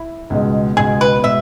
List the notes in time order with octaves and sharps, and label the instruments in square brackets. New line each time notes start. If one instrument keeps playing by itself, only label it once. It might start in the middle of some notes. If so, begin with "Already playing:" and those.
Already playing: [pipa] E4
[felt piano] C#2 B2 G#3
[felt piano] C#2 B2 G#3 [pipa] G#4
[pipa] B4
[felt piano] B2 G#3 [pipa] E5